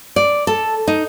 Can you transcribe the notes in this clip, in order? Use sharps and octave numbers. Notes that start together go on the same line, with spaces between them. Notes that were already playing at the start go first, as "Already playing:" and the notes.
D5
A4
D#4